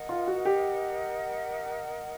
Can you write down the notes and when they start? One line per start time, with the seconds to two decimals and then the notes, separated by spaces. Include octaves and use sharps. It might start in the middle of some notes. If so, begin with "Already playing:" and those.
Already playing: A#4 D#5 F#5
0.09 F4
0.27 F#4
0.45 G4